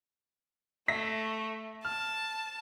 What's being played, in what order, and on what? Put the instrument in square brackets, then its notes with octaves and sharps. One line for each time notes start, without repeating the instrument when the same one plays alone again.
[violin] A3 [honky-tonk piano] E5 A#6 B6
[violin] A5 [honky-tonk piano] F6